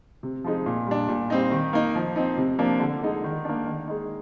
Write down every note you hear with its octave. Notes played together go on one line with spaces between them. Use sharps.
C3
F3 G#3 D#4
A#2
G3 D4
A#2
G3 C4 D#4
D#3
A#3 D#4
F3
C4 D#4
C3
F3 A#3 D4
D3
G#3 D#4
D#3
A#3 D4
D#3
G#3 D#4